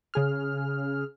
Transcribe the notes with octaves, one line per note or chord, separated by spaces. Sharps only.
C#3 G#4 F6